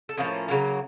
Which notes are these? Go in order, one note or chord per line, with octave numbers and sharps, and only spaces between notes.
A4
A2 F3 A#3 C#4 G#4
C#3 F#3 A#3 A#4